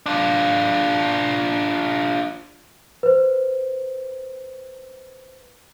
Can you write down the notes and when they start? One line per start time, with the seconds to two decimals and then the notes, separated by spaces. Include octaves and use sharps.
0.06 D4 F4
3.03 B4 C5